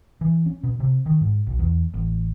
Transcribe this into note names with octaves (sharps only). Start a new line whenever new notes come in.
E3
C#4
B2
C3
D#3
G#2
B1
E2
A1